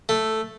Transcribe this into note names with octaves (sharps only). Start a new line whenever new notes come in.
A3